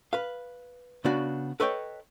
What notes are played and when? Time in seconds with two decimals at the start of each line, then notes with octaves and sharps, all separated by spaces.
0.13 B4 F5
1.05 C#3 B3 D4 F#4
1.60 A4 B4 C#5 D#5 G5